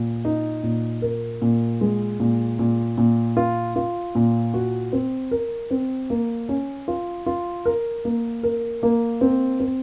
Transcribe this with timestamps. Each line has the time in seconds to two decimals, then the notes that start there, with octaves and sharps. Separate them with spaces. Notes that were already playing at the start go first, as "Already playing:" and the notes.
Already playing: A#2
0.25 D#4
0.63 A#2
1.02 A#4
1.42 A#2
1.81 G#3
2.20 A#2
2.59 A#2
2.98 A#2
3.37 F4
3.76 F4
4.15 A#2
4.54 F#4
4.93 C4
5.31 A#4
5.71 C4
6.10 A#3
6.49 C#4
6.88 F4
7.26 F4
7.66 A#4
8.05 A#3
8.43 A#4
8.83 A#3
9.21 C4
9.60 C4